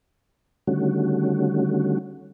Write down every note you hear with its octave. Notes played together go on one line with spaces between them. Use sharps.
D3 D#3 G3 A3 C#4 F#4